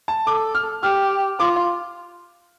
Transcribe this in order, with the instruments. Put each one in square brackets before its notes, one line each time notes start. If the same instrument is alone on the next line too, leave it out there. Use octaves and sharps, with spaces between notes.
[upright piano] A5
[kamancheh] A4 [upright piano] D6
[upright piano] F6
[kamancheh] G4 [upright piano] F6
[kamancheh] F4 [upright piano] D6